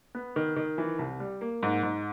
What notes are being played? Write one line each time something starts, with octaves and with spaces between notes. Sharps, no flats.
B3
D#3
D#3
E3
C2
G3
A#3
G#2
G#2